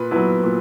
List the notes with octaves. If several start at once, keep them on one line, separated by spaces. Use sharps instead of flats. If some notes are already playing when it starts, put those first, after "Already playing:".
Already playing: A#2 B4
F#3 B3 E4
A#2